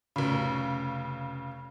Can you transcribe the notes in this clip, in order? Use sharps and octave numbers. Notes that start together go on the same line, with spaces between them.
F1 C#3